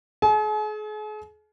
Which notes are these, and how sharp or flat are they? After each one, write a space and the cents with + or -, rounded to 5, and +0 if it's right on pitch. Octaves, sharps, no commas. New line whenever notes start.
G#4 +40 G#5 +45